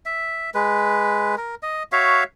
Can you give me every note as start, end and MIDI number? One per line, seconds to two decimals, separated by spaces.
0.06 0.50 76
0.55 1.35 56
0.55 1.35 71
1.38 1.55 70
1.63 1.83 75
1.92 2.24 66
1.92 2.24 73
1.92 2.24 76
1.92 2.24 77